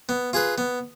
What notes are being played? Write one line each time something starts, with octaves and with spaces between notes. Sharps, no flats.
B3
F4 G#4 B4
B3